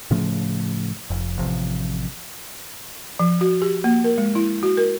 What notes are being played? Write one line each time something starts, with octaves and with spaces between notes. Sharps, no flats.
A2 C#3 F3 A3
F1 F2
A1 C3 F3
F3
F#4
G4
A#3
A#4
G#3
E4
F#4
A#4